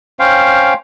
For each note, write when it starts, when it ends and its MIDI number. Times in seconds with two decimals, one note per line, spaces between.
0.19 0.74 61
0.19 0.74 72
0.19 0.74 77
0.19 0.74 79